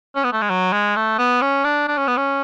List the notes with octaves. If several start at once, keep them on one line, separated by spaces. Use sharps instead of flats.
C#4
B3
A3
G#3
F#3
G#3
A3
B3
C#4
D4
D4
C#4
B3
C#4